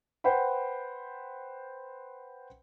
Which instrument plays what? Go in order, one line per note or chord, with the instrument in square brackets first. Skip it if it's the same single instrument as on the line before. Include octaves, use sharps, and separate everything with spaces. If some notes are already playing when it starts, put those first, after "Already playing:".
[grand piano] B4 C5 F#5 G5 B5